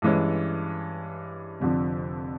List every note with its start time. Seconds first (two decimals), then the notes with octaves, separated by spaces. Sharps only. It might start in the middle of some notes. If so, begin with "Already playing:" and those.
0.02 G2 E3 G#3 C#4
1.60 F1 F2 D3 F3